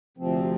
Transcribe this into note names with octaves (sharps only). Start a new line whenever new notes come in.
D2 C3 F3 C4